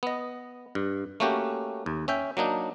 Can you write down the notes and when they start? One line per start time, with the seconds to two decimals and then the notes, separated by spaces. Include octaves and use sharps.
0.03 B3 D#5
0.75 G2
1.20 A3 A#3 C#4 F#4 G4
1.86 D#2
2.08 C#4 E5 G5
2.37 F#3 A#3 D4 D#4